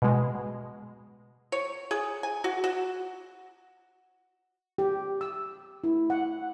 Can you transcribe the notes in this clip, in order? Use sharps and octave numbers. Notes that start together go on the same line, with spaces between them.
B2 G#3
C#5
G#4
G#5
F#4
F#4
G4
E6
E4
F#5